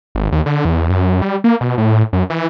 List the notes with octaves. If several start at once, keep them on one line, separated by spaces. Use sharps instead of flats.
G#1
D#2
D3
E2
F#2
G3
A#3
B2
A2
F#2
E3